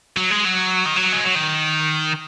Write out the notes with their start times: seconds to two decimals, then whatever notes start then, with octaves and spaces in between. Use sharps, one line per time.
0.17 F#3
0.30 G#3
0.45 F#3
0.86 D#3
0.96 F#3
1.13 G#3
1.24 F#3
1.35 D#3